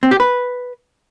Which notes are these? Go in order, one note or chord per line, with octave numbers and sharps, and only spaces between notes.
C4
G4
B4